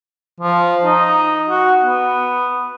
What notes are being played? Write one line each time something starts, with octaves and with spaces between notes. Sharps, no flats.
F3
D#4
F#4
B3